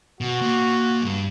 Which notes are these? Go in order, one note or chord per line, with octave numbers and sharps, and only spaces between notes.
B2 F#4
A#2
G2